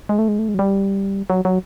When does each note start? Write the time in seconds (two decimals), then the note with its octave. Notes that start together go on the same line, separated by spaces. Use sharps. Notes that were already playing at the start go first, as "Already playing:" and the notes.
0.09 G#3
0.19 A3
0.28 G#3
0.39 A3
0.48 G#3
0.54 F#3
0.59 G3
1.30 F#3
1.45 F#3